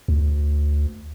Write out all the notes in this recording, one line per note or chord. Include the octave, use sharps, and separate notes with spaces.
D2